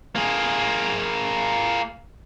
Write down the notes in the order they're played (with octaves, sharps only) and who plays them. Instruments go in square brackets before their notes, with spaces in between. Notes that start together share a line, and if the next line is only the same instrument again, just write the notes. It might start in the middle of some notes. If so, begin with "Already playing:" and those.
[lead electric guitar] A#3 G#4